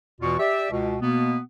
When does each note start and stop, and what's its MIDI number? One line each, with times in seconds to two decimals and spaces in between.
0.21 0.37 40
0.21 0.37 47
0.21 0.37 52
0.21 0.37 65
0.21 0.37 66
0.21 0.37 85
0.40 0.70 67
0.40 0.70 74
0.40 0.70 76
0.71 0.96 37
0.71 0.96 47
1.01 1.40 47
1.01 1.40 58
1.01 1.40 59